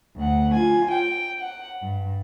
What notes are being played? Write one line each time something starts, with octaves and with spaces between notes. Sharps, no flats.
D2 F#5
F4 G#5
G5
F#5
G2